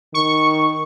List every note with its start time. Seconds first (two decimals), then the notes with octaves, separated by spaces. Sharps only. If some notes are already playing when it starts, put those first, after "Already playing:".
0.14 D#3 C#6